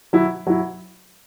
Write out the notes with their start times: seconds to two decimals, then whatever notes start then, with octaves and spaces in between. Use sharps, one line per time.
0.13 F#3 E4
0.47 F#3 E4